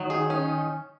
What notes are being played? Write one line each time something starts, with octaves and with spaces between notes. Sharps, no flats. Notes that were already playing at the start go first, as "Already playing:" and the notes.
Already playing: D#3 F#3
G#4
C#4